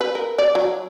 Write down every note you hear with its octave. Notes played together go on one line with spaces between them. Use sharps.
B4
A#4
D5
F#3